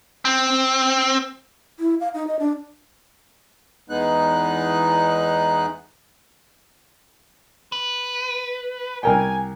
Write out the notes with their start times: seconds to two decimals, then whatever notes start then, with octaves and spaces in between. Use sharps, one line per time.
0.25 C4
1.79 E4
2.00 F5
2.14 D#4
2.27 D#5
2.39 D4
3.90 E2 G#3 B3 D#4 F#6
7.72 B4
9.03 C2 A#4 G5 G#5